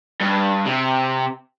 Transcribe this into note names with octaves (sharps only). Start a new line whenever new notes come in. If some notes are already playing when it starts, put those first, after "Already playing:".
G2
C3